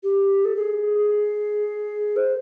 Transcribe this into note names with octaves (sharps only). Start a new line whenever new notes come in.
G4
A4
G#4
C5